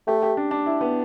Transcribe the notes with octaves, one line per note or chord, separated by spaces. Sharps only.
A3 G4
G4
D4
D4
E4
B3